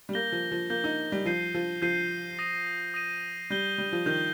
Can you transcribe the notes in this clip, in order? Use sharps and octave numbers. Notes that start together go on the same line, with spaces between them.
G3
A#3 G6 A#6 G7
F3
F3
A#3 G6 A#6 G7
D#4
G3
F3 G6 C7 D#7
F3
F3 G6 C7 D#7
D#6 A#6 D#7
D#6 A#6 D#7
G3 G6 A#6 G7
G3
F3
D#3 G6 A#6 G7